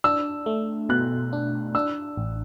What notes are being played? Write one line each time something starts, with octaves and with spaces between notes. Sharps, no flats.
D4 E6
A3
B2 F#6
D4
D4 E6
A1